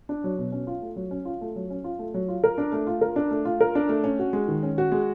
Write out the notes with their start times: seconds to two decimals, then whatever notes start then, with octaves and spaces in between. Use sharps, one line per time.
0.09 D4
0.24 F#3
0.38 B2
0.52 C#4
0.67 F4
0.82 A3
0.96 F#3
1.11 C#4
1.25 F4
1.41 A3
1.56 F#3
1.70 C#4
1.84 F4
1.99 A3
2.14 F#3
2.28 F4
2.44 A#4
2.58 D4
2.72 A3
2.87 F4
3.01 A#4
3.16 D4
3.31 A3
3.45 F4
3.61 A#4
3.75 D4
3.89 A3
4.04 C#4
4.19 F#4
4.33 G#3
4.48 D#3
4.63 C#4
4.78 F#4
4.92 G#3